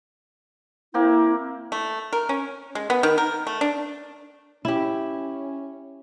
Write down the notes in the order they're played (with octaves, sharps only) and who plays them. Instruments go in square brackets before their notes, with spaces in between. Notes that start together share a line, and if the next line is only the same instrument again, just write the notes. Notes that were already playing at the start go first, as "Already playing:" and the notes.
[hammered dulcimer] A#3 C4 C5 [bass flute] E4
[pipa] A3
A#4
C#4
G#3
B3
D#3
A#4
A3
D4
[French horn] C#4 [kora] E4 G4